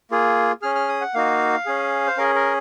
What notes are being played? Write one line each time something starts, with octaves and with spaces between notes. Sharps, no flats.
A#3 F4 G#4
C#4 G#4 F6
F6
D#6
F#5
A#3 D#4 F#4 F5
C#4 G#4
C5
C#4 G#4 A#4
A#4